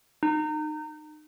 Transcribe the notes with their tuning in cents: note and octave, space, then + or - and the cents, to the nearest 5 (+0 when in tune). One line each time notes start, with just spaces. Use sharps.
D#4 -30